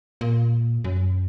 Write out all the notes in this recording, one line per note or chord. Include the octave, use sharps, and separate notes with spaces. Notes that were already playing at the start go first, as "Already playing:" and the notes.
A#2
F#2